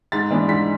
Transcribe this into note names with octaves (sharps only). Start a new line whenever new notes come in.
G#2 A6
E3 B3 D4
G#2 B6